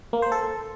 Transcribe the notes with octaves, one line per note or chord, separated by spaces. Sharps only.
A#3
C5
A4